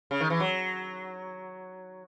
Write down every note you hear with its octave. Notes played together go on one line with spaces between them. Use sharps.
C#3
D#3
E3
F#3